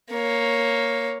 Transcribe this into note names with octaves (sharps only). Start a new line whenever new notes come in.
A#3 C#5